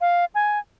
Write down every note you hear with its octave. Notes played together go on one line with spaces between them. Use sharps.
F5
G#5